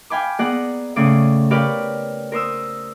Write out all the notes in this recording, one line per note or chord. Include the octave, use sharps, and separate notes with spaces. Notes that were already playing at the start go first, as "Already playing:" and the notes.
F5 G5 G#5 B5 D6
B3 G#4 D5 F#5 A#5
A2 C#3 D5 D6
G4 A#4 B4 C#5 D5 F5
A#4 C5 D#6 E6